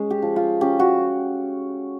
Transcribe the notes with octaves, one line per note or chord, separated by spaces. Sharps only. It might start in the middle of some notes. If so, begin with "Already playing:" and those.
Already playing: G#3 C#4
G4
F3
F4
C#4 G4
F#4